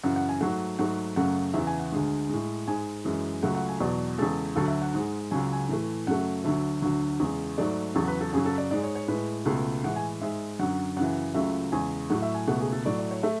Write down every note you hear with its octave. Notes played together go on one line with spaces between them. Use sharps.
F#2 C#3 E3 F#5
F#5
G#5
G#2 F#3 A3 F#5
G#2 F#3 A3 F#5
F#2 C#3 F#3 A3 F#5
E2 C#3 E3 E5
G#5
F#5
D2 D3 G#3
A2 G#3
G#2 G#3 G#5
F#2 E3 G#3
C#2 C#3 F#3 A3 F#5
F#5
G#5
E2 B2 F#3 D5
E2 C#3 G#3 A4
D2 D3 F#3 A4
E5
F#5
G#2 G#3
C#2 C#3 F#3 G#5
G#5
A2 E3 A3
F#2 C#3 F#3 A3 F#5
D2 D3 F#3 E5
D2 D3 F#3
E2 C#3 G#3
G#2 F#3 A3 D5
E2 C#3 F#3 A4
B4
A4
F#2 C#3 F#3 G#4
A4
D5
G#2 G#3 D5
C#5
C#5
A2 G#3 B4
C#2 B2 A3
A2 E3 G#3 F#5
G#5
G#2 G#3 E5
F#2 D3 F#3 F#5
F#2 C#3 E3 F#5
C#2 C#3 F#3 A3 E5
E2 C#3 G#3 G#5
A2 F#3 A3 F#5
E5
G#5
C#2 B2 A3 F#5
G#4
A4
A2 F#3 A3 D5
D5
C#5
A3 E5